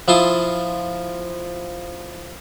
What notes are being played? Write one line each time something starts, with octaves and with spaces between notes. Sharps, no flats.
F3 E4 F4 A5 C6 D#6